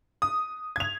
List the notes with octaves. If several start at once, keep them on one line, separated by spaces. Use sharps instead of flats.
D#6
G#6 F7